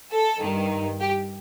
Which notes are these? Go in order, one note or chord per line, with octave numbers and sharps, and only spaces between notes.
A4
G2 D#3
G4